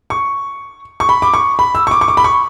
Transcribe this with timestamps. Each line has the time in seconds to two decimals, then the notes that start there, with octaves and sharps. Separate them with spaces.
0.10 C#6
1.00 C#6
1.09 B5
1.22 D6
1.34 C#6
1.59 B5
1.75 E6
1.87 C#6
1.91 D6
2.01 C#6
2.08 D6
2.17 B5
2.24 C#6